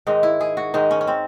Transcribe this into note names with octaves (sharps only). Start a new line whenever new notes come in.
G#2 D#3 G#3 D#4
E4
G#4
F#4
G#2 D#3 G#3 D#4
C#4
C#4
C4